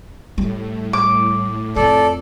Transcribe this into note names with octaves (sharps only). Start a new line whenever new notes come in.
A2 G3
D6
F2 F4 A4 D5